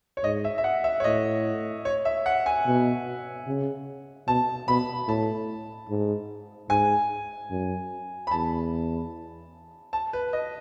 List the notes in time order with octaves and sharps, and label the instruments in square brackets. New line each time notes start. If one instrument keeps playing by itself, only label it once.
[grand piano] C#5
[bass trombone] G#2 [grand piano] D#5
[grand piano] E5
E5
F#5
E5
C#5
[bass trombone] A2 [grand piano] D#5
[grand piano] C#5
E5
F#5
G#5
[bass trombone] B2
C#3
[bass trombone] B2 [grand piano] A5
[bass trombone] B2 [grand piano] B5
[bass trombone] A2 [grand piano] A5
[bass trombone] G#2
[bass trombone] G#2 [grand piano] G#5
[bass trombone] F#2
[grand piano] B5
[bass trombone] E2 [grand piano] A5
[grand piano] A5
B4
D#5